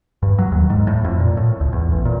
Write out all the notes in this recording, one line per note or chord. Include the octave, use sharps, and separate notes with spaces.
G2
F#3
D#2
G#2
A2
F2
A#2
A2
C#2
E2
A1
A#2